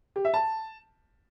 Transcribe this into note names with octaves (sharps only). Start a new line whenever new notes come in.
G4
E5
A5